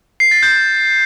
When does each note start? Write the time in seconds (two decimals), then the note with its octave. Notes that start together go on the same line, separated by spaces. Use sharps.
0.20 C7
0.31 A6
0.43 G6